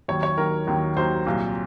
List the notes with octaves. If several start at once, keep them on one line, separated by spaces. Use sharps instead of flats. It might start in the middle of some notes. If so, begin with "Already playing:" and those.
D#2 D#3 F#3 C#5
C#5
D#2 D#3 F#3 A#4
D#2 D#3 F#3
D#2 D#3 F#3 C5
C2 A#2 F#3